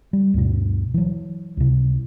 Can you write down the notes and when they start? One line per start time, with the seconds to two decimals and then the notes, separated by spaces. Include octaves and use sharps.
0.13 G3
0.34 D2 G2 B2
0.94 E3 F#3
1.57 C#2 C3